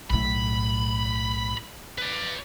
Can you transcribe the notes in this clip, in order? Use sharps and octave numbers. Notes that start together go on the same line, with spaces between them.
B1 A2 B5
B4 D5